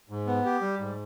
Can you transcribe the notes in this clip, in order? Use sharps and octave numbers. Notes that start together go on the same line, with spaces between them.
G#2
B3
G4
G3
G#2